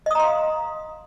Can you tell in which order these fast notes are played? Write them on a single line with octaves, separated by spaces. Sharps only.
D#5 D#6 A#5 C6 F5